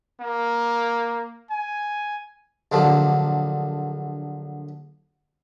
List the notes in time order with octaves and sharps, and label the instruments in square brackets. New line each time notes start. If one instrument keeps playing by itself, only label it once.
[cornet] A#3
G#5
[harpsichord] A#1 D3 F3 F#3